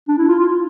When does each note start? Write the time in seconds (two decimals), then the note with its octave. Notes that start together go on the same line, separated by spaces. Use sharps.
0.08 D4
0.18 E4
0.29 F4
0.39 F4